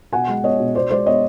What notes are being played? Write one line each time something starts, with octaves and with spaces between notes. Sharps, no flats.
B2 F#5 G#5
G#3
B3 C#5 D#5
B2
B2 C5 D5
G#3 C5 D5
B3 C#5 D#5